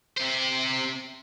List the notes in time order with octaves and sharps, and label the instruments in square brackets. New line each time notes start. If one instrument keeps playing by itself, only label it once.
[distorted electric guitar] C3 C5